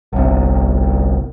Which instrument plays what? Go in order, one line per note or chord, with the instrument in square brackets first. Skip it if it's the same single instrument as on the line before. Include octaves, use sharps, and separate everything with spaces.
[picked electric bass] G1 C2